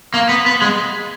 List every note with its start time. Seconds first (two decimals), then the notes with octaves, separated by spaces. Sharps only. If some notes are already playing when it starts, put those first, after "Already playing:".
0.14 A#3
0.29 B3
0.46 B3
0.62 G#3